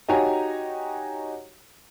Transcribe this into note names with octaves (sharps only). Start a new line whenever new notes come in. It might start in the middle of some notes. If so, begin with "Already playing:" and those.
D#4 F#4 G4 C#5 G#5 A#5